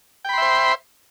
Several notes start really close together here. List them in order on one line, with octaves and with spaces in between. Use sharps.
G5 B5 C6 E5 C5